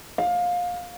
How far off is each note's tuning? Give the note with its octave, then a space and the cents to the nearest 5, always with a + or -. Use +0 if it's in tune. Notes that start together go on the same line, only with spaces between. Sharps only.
F5 +25